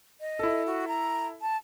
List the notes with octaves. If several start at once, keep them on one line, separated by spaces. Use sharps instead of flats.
D#5
E4 A4
F#4
A#5
A5